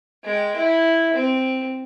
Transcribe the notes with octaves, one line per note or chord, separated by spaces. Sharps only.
G#3 G5
E4
C4